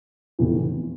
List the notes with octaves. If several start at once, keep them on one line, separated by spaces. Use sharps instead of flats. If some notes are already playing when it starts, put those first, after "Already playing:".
F1 E2 E3